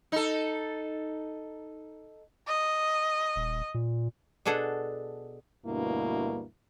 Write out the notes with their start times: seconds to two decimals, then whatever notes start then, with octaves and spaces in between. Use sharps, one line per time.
0.12 D#4 A4
2.48 D#5
3.36 D#1
3.74 A#2
4.45 B2 D4 G#4 A4 F#5
5.66 D2 G2 B2 A#3 D4 E4